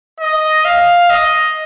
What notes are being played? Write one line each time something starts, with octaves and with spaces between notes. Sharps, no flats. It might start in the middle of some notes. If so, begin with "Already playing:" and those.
D#5
F5
D#5